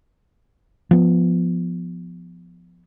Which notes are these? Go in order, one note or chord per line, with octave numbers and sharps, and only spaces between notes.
F3 B3